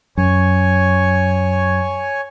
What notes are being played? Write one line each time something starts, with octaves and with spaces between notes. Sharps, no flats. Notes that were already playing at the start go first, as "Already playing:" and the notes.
F#2 C#5 G#5 C#6